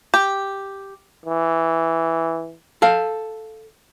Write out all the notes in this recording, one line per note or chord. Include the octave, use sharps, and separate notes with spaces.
G4
E3
A4 F5